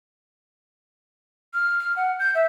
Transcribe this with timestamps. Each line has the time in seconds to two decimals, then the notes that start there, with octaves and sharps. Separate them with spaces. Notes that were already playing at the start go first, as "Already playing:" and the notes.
1.54 F6
1.79 F6
1.96 F#5
2.19 G6
2.35 E5